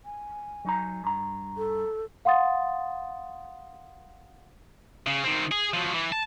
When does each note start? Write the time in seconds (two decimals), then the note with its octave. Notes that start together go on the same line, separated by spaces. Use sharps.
0.05 G#5
0.65 F#3 D#4 A#5
1.04 G2 A#5
1.57 A4
2.25 F5 F#5 C6 D#6 A6
5.07 C#3
5.23 D#3 C4
5.51 G#4
5.74 F3 F#3
5.94 E3
6.12 A5